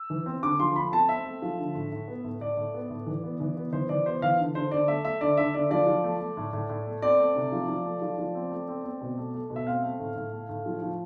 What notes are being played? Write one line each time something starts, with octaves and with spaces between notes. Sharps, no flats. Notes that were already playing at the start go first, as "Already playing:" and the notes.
Already playing: E6
E3
C4
D3 D6
F3 C6
A3 B5
C4 A5
C4 E5
A3
F3
D3
A2
A2
B3
A2
A2 D5
A2
B3
A2
E3
B3
E3
B3
E3 C5
E3 D5
B3 C5
E3 F5
D3
D3 C5
D3 D5
A3 E5
A3 E5
D3 D5
D3 E5
D3 D5
F3 D5
F3
A3
A3
A2
A2
A2
A3
C4 D5
A3
C3
F3
F3
A3
F3
F3
C4
A3
C4
C4
B2
A3
A3
B2
E5
C4 F5
A3
A2
A2
A3
A2
F3
F3